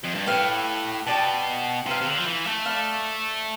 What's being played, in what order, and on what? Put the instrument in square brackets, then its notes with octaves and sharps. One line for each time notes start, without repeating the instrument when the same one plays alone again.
[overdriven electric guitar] F2
G2
[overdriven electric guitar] A2 [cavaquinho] G4 B4 F5
[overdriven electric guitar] B2 [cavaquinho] G4 D5 A5
[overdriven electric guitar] C3 [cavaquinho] F4 B4 F5
[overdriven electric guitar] C3
D3
F3
E3
A3
[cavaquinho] D5 F5 B5